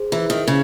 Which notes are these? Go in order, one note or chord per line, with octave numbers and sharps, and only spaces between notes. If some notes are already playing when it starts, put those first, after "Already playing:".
Already playing: G#4 C5
E3
D#3
C#3